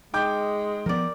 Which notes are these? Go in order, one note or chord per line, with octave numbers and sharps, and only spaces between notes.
G#3 D#4 G5 D6 G6
F3 B3 A#4 D5